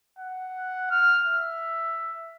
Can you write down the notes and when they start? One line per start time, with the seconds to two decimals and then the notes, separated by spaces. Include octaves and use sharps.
0.19 F#5
0.91 F6
1.27 E5